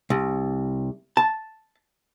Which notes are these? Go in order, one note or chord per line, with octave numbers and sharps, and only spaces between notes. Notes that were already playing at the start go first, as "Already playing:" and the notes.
C2
A5